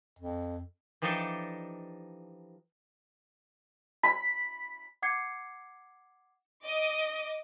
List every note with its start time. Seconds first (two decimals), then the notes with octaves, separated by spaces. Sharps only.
0.19 F2
1.02 E3 F3 D4 D#4 G4 A4
4.03 B5
5.02 F#5 D6 G#6 C7 C#7
6.62 D#5 D6